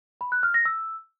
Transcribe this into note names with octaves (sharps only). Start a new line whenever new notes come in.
B5
F#6
F6
A#6
E6